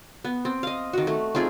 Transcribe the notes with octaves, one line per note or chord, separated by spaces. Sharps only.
B3
C4
D#5 F5
D#3 F#4
A3
C4 D#4 F4 G#4